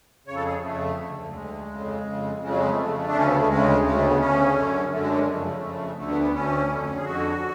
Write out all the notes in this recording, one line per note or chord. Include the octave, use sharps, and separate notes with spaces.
F2 C#3 C#5
A4
G#4
F2 C#3 A3
D2 D3
F#3
D2 D3 G#3
F2 C#3
F2 C#3
F2 C#3 G#3
F#3
G#3
A3
F2 C#3
D4
D2 C#3 C#4
B3
A3
D2 C#3 G#3
D2 C#3 G#3
A3
B3
D2 C#3 C#4
F#2 D3
F#2 D3 A3
G#3
F#3
G#3
F2 C#3 A3
F2 C#3
D2 D3 A3
B3
B3
D2 D3 C#4
F2 D3
G#4
F2 D3 F#4